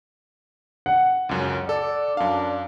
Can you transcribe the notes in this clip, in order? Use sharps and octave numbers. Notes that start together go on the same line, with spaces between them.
F#5
C#2 F#2 C#4
A4 D5
F#2 D4 F5